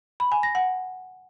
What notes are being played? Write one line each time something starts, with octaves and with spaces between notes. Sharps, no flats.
B5
G#5
A#6
F#5